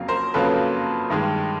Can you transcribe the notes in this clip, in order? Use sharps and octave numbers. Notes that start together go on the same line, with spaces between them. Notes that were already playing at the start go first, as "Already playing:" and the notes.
Already playing: F2 C#3 F#3 A#3 F5
A#4 C5
F2 C#3 F#3 A#3 A4 B4
G2 D#3 G#3